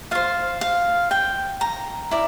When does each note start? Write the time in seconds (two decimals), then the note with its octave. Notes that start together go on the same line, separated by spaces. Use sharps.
0.11 F4 C5 F5
0.61 F5
1.11 G5
1.61 A#5
2.11 E4 A#4 D5